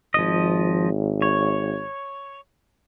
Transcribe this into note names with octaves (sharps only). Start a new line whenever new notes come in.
G#1 F3 D#5
C#5